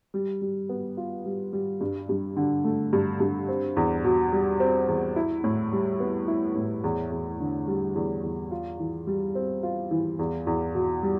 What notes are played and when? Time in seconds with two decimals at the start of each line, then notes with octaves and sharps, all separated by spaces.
0.14 G3
0.41 G3
0.69 B3
0.97 F4
1.26 G3
1.53 G3
1.81 G2
2.09 G2
2.37 D3
2.64 A3
2.93 G2
3.20 G2
3.49 C4
3.76 E2
4.04 B2
4.32 G3
4.60 C4
4.88 E2
5.16 E4
5.44 A2
5.72 G3
6.00 B3
6.28 E4
6.56 A2
6.84 E2
7.11 E2
7.40 D3
7.67 G3
7.95 E2
8.23 E2
8.51 F4
8.79 E3
9.07 G3
9.35 C4
9.63 F4
9.91 E3
10.19 E2
10.47 E2
10.75 B2
11.03 G3